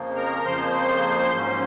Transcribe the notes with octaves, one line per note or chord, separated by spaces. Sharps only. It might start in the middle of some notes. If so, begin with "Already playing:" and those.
Already playing: F2 C#3 F3 A#3
A#4 A#5
F2 C#3 F3 A#3 C5 C6
G#2 F#3 A#3 C#4